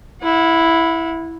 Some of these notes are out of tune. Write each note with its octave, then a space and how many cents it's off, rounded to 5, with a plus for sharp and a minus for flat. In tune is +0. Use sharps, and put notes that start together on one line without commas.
E4 +0 F#5 -40